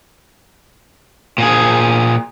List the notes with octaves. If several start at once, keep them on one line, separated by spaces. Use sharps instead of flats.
A#2 G#4